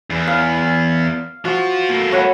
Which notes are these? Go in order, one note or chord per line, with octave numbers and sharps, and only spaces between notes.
E2
F5
F3 F4 F#4
A3 A#3
C#5 F#5 B5